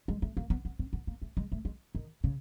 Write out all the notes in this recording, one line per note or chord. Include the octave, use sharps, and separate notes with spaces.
G#3
A3
A#3
B3
B3
C4
B3
A#3
A3
G#3
A3
G#3
D#3
C#3